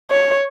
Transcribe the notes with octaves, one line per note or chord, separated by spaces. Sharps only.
C#5